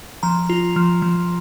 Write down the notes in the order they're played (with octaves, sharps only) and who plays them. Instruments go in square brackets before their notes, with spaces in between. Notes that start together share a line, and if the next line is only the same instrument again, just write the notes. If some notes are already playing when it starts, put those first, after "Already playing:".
[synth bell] F3 A#5
F4
F3
F3